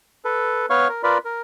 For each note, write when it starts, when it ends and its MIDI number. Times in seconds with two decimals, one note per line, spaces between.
0.25 0.66 69
0.25 0.66 71
0.70 0.88 59
0.70 0.88 71
0.70 0.88 73
0.70 0.88 77
0.70 0.88 85
0.70 0.88 89
0.89 1.03 70
1.03 1.18 65
1.03 1.18 70
1.03 1.18 71
1.03 1.18 74
1.03 1.18 83
1.25 1.42 70